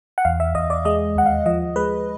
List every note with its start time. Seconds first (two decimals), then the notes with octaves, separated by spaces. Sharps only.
0.18 F#5
0.25 E2 F5
0.40 E5
0.55 E2 D#5
0.70 D5
0.85 G#3 D#5
1.16 D#2 F#5
1.26 F5
1.46 F3 D#5
1.76 G#3 B4